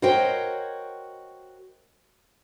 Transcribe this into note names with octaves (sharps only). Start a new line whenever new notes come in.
F#4 A#4 C5 C#5 D#5 G5